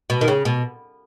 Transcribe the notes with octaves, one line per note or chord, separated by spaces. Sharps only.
B2
D#3
C#3
B2